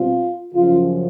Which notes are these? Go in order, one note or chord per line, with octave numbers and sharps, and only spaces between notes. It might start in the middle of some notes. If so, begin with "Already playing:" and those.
Already playing: B2 G3 C4 F4
F#2 C#3 F3 F4